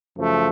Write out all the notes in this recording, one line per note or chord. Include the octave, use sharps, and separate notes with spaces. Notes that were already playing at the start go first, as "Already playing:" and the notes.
F#2 C#3 F3 A3